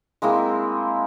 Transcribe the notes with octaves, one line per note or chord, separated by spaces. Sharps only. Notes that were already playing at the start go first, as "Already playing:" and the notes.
G#3 A#3 C4 E4